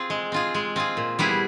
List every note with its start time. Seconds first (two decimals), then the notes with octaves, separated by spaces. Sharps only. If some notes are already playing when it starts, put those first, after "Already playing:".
Already playing: C4 F4 G#4
0.10 G#3
0.32 C4 F4 G#4
0.54 G#3
0.76 C4 F4 G#4
0.97 A#2
1.19 G3 B3 E4 G#4